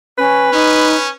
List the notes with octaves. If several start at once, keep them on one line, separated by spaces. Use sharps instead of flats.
C#4 B4
C#4 D#4